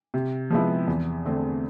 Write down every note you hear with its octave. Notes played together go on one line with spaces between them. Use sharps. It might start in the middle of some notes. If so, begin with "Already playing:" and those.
C3
F3 G#3 B3 E4
E2
D3 A3 C4